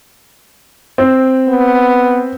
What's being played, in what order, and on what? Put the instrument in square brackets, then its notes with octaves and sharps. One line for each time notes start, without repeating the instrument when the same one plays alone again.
[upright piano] C4
[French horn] B3